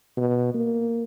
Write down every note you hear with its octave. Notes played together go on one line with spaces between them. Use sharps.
B2
A#3